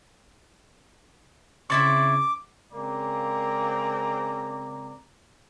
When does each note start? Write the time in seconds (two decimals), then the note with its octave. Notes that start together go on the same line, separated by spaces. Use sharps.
1.70 C#3 C4 E4 E5 C#6 D6 A6
2.73 C#3 G#3 A#3 C4 D5 A#5